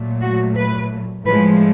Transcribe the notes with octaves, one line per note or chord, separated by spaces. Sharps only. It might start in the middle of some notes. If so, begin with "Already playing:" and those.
Already playing: A#2 F#3 A3
F#4
B4
A2 F3 G#3 B4